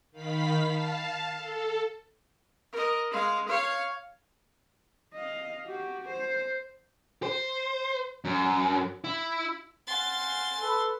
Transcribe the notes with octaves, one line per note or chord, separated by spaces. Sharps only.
D#3 F5 B5 B6
F5 A5
A4
A#4 D#5
G#3 F5
C#5 F5
D#5 F5
F#4 G4
C5
C5
F#2
E4
F5 F#5 G#5 C6 A6
A4 B4